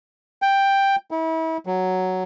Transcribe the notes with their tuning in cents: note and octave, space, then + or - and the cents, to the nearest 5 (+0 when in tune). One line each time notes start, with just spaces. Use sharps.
G5 +5
E4 -35
F#3 +5